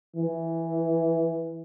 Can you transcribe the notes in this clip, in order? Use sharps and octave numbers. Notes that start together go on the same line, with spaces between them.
E3